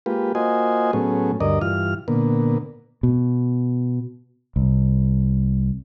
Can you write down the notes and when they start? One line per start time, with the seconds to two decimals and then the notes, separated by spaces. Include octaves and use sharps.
0.06 G#3 A#3 F4 G4 B4
0.35 A#3 F4 F#4 C5 D#5 G#5
0.93 A2 F#3 A3 B3 C#4 G#4
1.40 D2 G2 A#4 D5 D#5
1.61 G2 E3 F4 F6
2.08 A#2 D3 A#3 B3
3.03 B2
4.56 C2